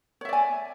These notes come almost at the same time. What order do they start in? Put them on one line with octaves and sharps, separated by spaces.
C#5 E5 D5 G#5